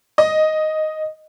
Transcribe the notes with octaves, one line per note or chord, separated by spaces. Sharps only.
D#5